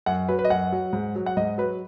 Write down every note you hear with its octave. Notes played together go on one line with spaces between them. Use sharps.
F#2 F#5
F#3 B4
B4
D#5
F#2 F#5
F#3
G#2
F#3
F#5
G#2 D#5
F#3 B4